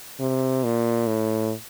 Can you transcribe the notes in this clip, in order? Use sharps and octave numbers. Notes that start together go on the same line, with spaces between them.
C3
A#2
A2